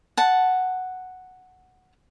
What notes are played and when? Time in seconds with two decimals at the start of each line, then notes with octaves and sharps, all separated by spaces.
0.17 F#5 A5